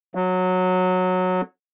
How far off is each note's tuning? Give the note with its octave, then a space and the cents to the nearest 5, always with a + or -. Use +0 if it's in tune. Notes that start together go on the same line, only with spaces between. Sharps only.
F#3 -15